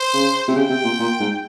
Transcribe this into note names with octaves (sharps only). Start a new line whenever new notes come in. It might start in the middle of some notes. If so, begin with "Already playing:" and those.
Already playing: C5
C#3
C3
C#3 G5
C3
A#2
A#2
G#2